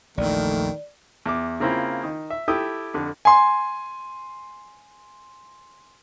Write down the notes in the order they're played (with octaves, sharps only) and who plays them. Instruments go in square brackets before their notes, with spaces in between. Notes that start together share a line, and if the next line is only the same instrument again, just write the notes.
[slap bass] A#1 E2 [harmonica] D#3 [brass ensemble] A3 [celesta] D5
[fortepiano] E2 D6
C#3 A#3 C4 E4 F4
D#3
E5
E4 G4 A4 G5 D#6
F2 D3
[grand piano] G#5 C6